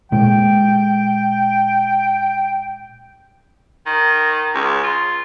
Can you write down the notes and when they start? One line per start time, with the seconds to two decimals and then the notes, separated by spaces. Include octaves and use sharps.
0.12 A#2 G#3 G5
3.86 D#3
4.54 C#2
4.83 F4